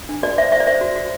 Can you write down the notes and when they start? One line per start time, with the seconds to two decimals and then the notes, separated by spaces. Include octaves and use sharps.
0.09 D4
0.23 F#4 D5
0.38 C5 E5
0.52 C5 E5
0.60 D5
0.67 C5 E5
0.81 F#4
0.96 F#4